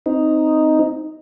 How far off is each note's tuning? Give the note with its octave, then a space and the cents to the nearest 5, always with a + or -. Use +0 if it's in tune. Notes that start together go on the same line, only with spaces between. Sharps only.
C4 +0 D#4 +0